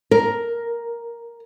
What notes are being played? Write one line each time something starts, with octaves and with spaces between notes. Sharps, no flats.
A#4